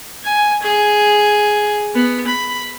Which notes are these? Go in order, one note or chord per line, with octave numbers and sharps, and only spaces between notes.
G#5
G#4
B3
B5